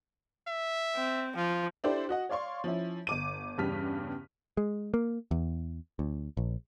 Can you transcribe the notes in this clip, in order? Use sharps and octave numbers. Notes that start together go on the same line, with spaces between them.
E5
C4
F3 F4
D4 E4 G4 A4 C5 D5
F#4 D#5 F#5
C#5 D5 F5 C6 C#6
F3 C#4 E4
G1 D6 D#7
E2 G2 C#3 G3 F6 B6
G#3
A#3
E2
D2
A#1